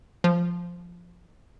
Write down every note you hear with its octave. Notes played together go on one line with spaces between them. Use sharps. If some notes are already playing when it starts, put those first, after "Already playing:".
F3